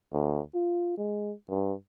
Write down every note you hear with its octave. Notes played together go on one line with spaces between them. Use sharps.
D2
F4
G#3
G2